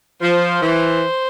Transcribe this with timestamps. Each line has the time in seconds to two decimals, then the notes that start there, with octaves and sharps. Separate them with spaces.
0.21 F3 C5
0.62 E3